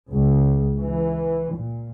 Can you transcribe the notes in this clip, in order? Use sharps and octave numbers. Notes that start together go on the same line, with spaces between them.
C#2
E3
A#2